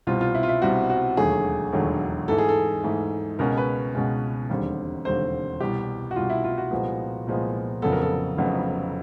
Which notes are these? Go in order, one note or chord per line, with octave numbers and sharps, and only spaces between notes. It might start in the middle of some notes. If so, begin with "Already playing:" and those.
C2 B2 G3 C4 F4
F4
E4
F4
E4
C2 B2 G3 C4 F#4
F#4
E1 D#2 D3 F#3 A3 G#4
E1 D#2 D3 F#3 A3
G#2 E3 A3 A4
G#4
A4
G#2 E3 A3
C#2 B2 G#3 C#4 A#4
B4
C#2 B2 G#3 C#4
E1 D#2 D3 G3 C4
E1 D#2 D3 G3 C4 C5
C2 B2 G3 G4
F#4
C2 B2 G3 F4
E4
F4
F#4
C2 A#2 F3 G#3 B3
C2 A#2 F3 G#3 B3
F1 F2 C#3 F#3 B3 A4
A#4
A4
F1 F2 C#3 F#3 B3